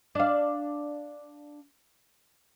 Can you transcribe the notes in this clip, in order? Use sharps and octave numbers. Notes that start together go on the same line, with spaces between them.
D4 F5